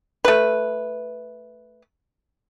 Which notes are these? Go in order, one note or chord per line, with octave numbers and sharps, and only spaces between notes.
A3 B4